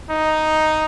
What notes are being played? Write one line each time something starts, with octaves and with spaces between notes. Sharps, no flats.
D#4